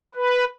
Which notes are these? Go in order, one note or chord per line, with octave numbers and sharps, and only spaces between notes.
B4